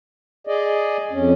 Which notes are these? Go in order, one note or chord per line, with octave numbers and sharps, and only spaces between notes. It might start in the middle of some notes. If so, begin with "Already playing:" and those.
G#4 D5 D#5
F2 C#4